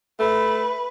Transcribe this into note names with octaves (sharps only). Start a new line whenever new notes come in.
A3 B4